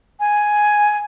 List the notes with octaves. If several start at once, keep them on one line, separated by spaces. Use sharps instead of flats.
G#5